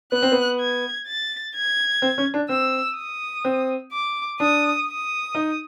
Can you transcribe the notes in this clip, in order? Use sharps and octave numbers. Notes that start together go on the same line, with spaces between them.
B3 F#6
C4
B3
G#6
A6
G#6
C4
C#4
D4
C4 E6
D#6
C4
D6
D4 D#6
D#6
D#4